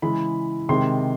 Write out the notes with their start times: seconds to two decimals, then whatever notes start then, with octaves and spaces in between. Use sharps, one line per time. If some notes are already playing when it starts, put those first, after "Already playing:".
0.02 C#3 E3 G#3 B5
0.69 C3 D#3 G#3 C6